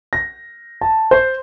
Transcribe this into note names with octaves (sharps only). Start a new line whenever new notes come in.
A#6
A5
C5